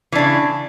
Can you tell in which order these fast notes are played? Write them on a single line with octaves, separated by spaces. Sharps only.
E3 D4 C#3